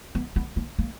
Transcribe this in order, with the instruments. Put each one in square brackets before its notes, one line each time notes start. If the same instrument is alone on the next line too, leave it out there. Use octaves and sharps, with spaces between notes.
[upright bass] B3
B3
A#3
A#3